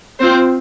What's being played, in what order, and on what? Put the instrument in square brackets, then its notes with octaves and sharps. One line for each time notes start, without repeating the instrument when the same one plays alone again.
[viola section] C4 F4 C5